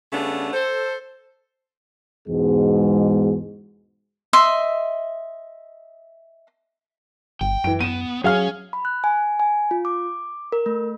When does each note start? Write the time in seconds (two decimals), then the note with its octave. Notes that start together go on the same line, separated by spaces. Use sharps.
0.13 C#3 G3 A3 B3 C#4 D4
0.53 A4 C5
2.28 E2 G#2 B2 G#3
4.33 D#5 E5 C6
7.41 G1 G5
7.64 F#2 E3 D7
7.81 B3 D#7 E7
8.24 F#3 C#4 G#4 C#5 F5 F6
8.73 B5
8.85 F#6
9.04 G#5
9.40 G#5
9.71 F4
9.85 D6
10.52 A#4
10.66 A3